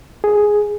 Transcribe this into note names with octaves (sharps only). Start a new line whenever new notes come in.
G#4